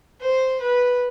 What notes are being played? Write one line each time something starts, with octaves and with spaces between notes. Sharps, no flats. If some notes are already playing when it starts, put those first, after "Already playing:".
C5
B4